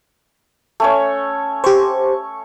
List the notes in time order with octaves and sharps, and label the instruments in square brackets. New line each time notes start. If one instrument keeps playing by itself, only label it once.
[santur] A3 C#4 C#5
[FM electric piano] G4 C5 [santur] C#6